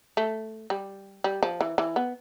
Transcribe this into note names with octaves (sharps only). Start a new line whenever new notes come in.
A3
G3
G3
F3
E3
E3
B3